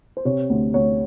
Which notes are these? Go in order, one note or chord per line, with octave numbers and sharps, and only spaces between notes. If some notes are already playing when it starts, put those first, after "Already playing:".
C5
C3 C#5
D2
D2 C#5